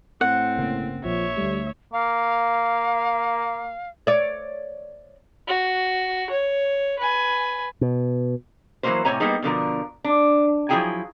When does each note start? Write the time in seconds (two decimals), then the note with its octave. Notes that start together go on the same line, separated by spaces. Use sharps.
0.21 A2 C4 F#5
0.57 G1 C#3 A#3
1.04 A#1 A#2 F3 C#5 E5
1.37 D2 G3 A3
1.93 A#3 F5
4.07 C#5 D5
5.47 F#4
6.30 C#5
6.99 B4 G#5
7.81 B2
8.83 E3 F#3 A3 A#3 A#4 C5
9.05 A2 C3 C#5 G#5 A#5
9.20 G3 A#3 B3 D#4 G#4
9.42 B2 D3 F3 A#4
10.04 D4
10.69 F3 F#3 E4 G#4 G5 G#5